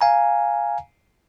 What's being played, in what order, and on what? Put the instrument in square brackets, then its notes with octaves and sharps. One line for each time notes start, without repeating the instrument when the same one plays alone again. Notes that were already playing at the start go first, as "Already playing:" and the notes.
[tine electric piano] F5 G#5 A#5